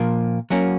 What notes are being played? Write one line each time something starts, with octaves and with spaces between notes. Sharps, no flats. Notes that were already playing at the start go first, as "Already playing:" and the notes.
Already playing: A#2 F3 A#3
F#3 A#3 C#4 F#4